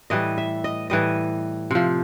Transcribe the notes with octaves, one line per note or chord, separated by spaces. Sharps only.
A2 E3 G3 D#5
E5
D#5
A2 E3 G3 D#5
C3 F3